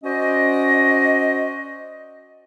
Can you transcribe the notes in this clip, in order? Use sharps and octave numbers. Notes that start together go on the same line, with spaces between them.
C#4 F#4 C5 D5 D#5